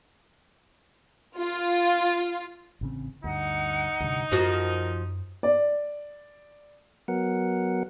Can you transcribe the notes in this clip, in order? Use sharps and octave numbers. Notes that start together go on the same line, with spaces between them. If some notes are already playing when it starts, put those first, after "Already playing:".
F4
A1 C#3 C4
D2 G2 D#4 F#5
D2 G2 C3
F#2 F3 F#4 A#4
D5
F#3 B3 A#4 F#5